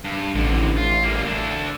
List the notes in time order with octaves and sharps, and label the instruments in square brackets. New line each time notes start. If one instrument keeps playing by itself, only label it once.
[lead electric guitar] G2
[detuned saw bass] A1 [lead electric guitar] F2 D3
[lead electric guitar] F4
G3 A#3
A3 D4